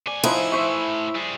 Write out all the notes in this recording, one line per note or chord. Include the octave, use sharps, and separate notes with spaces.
A2 D5 G#5
F3 D#4 E4 B4
C5 E5 C#6
G3 G#4